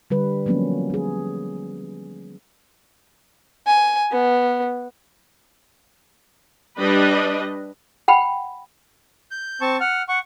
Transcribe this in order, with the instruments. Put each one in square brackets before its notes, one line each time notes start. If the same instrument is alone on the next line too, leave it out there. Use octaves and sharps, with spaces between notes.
[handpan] D3 G3 B4
F3 F#3 A#3 B3 C#4
G3 G#4
[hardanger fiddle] G#5
B3
[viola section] G3 D4 B4 D#5
[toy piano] F#5 G5 B5
[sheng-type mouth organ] G6
C4 A5 C#6
F#5 F6
F#5 C#6